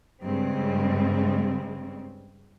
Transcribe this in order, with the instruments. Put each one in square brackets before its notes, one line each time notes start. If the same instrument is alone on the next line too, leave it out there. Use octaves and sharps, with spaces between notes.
[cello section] G2 C#3 G#3 C4